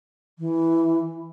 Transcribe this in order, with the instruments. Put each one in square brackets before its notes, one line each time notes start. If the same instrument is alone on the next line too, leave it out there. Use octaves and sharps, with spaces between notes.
[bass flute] E3